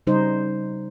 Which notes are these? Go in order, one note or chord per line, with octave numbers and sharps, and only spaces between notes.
C#3 G3 D#4 C5